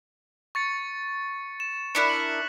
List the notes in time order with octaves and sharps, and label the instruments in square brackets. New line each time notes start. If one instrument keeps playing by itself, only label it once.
[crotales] C#6 A6 C#7
E7
[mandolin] D4 E4 A#4 [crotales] F#6 B6 C#7
[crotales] F#7